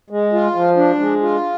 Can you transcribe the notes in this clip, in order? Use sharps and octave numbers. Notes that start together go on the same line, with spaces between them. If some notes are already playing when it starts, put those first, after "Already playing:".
G#3
F4
F3
D4
G#3
F4